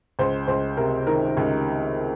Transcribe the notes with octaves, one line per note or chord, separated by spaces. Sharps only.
C#2 C5
C#2 C5
C3 A#4
D#3 A#4
C#2